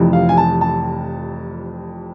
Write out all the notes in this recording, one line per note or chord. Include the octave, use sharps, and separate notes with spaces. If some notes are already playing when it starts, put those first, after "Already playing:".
Already playing: F1 F2 C3 E3
F5
G#5
A5
A5